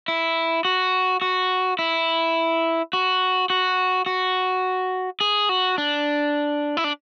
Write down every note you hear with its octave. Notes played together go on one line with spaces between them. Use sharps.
E4
F#4
F#4
E4
F#4
F#4
F#4
G#4
F#4
D4
E4
D4